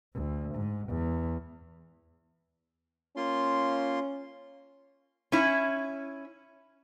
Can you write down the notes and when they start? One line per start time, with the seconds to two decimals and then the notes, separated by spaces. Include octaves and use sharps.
0.14 D2
0.54 G#2
0.88 E2
3.17 A#3 C#4 F4 C6
5.32 C#4 E4